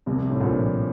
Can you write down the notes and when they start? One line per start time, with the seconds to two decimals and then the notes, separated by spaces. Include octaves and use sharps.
0.06 C2 C3
0.30 A2
0.41 A#1 A#2